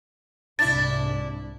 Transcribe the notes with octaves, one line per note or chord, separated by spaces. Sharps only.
C2 G#2 D4 E4 A6